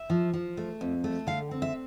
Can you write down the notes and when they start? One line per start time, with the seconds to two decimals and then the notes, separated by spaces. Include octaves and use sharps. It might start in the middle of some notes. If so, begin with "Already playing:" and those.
Already playing: E5
0.10 F3
0.33 F3
0.57 A3
0.81 F2
1.04 A3
1.27 D3 F5
1.51 C4
1.62 E5